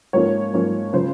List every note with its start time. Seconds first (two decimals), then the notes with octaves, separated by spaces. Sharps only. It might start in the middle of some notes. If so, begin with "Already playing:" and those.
0.13 G#2 F3 A#3 C#4 C#5
0.53 G#2 F3 A#3 C#4
0.93 C#3 F3 G#3 C5